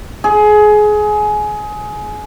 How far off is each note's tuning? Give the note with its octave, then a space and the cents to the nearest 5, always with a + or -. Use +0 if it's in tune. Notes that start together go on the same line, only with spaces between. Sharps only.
G#4 +20